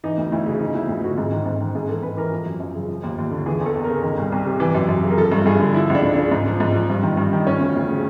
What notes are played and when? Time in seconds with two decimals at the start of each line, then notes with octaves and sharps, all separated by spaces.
0.04 E3 D#4
0.18 D2
0.32 D2 E4
0.46 C#3
0.60 F3 D#4
0.75 D2 E4
0.89 D2
1.04 D3 F#4
1.18 G#2 G#4
1.31 D#3
1.46 G#2
1.60 D#3
1.75 G#2 G#4
1.89 E3 A4
2.03 G#2 B4
2.17 E3 A#4
2.32 F3
2.46 F#2
2.60 F#2
2.75 C#3
2.88 F3
3.03 D#2
3.18 D#2
3.31 D3
3.46 E3 G#4
3.61 E2
3.66 A4
3.75 E2
3.84 C#3 A#4
4.03 D#3
4.17 C2
4.32 C2
4.46 C3
4.60 E3
4.75 F#2
4.89 F#2
5.03 C#3
5.11 A#4
5.17 F3 A4
5.32 G2
5.46 G2 G#4
5.60 D3
5.74 F3 E4
5.90 C#2
5.95 D4
6.03 C#2
6.14 C#3 D4
6.31 G#2
6.47 F3
6.60 G#2
6.75 F3
6.90 G2
7.03 D#3
7.17 G2
7.33 D#3
7.47 F3 C#4
7.60 D2
7.76 D2
7.89 C#3